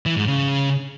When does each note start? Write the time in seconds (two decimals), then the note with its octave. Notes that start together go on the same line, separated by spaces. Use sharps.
0.06 E3
0.17 G#2
0.27 C#3